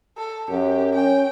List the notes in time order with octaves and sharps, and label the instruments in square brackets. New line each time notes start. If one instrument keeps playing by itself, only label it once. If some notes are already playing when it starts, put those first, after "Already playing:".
[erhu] A4
[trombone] F#2 [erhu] G4
[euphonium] C#4 [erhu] G5